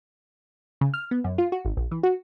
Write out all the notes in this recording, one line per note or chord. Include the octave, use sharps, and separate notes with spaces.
C#3
F6
B3
F#2
F4
F#4
G#1
A#1
E3
F#4